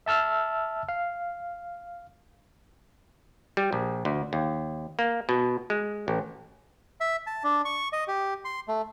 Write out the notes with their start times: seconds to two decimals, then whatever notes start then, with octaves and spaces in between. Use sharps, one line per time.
0.06 E5 A5 E6 F6
0.89 F5
3.57 G3
3.73 A#1
4.05 D2
4.33 D#2
4.99 A#3
5.29 B2
5.70 G#3
6.08 A1
7.01 E5
7.27 A5
7.44 D4
7.65 C#6
7.93 D#5
8.08 G4
8.45 C6
8.68 A3